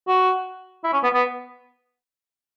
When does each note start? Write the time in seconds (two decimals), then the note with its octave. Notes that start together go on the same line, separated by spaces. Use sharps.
0.08 F#4
0.84 E4
0.93 C#4
1.03 B3
1.14 B3